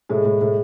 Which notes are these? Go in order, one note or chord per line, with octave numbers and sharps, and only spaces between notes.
A2 G#3
A2
A2